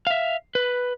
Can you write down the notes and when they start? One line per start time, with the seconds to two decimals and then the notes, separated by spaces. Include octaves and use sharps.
0.07 E5 F5
0.55 B4